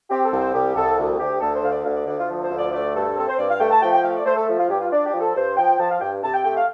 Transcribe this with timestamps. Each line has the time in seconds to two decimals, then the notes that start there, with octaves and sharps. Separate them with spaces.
0.10 C4 G4
0.25 A4
0.32 C2
0.40 C5
0.54 C2 G4
0.76 C2 A4
0.98 D2
1.19 D2 G4
1.41 D2 A4
1.56 C5
1.63 D3 F5
1.71 D5
1.85 D2 F5
1.96 D5
2.07 D2 D5
2.18 F4
2.29 F3
2.38 A4
2.44 C5
2.50 D2
2.58 D5
2.73 A3 D5
2.95 G2 A4
3.17 C4 A4
3.28 C5
3.39 G2 D5
3.49 F5
3.60 A3 G5
3.71 A5
3.82 F3 G5
3.93 G5
4.04 A3 F5
4.16 D5
4.26 A3 C5
4.36 A4
4.48 F3
4.59 F4
4.70 G2 G4
4.80 F4
4.92 D4 D5
5.06 G4
5.13 F3
5.21 A4
5.35 G2 C5
5.57 F3 G5
5.79 F3 A5
5.90 F5
6.01 G2 G5
6.23 C3 A5
6.34 G5
6.45 A3 G5
6.56 F5